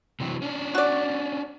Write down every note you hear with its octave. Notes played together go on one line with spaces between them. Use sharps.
C3 E3 F#3
C#4 D4
F#4 D5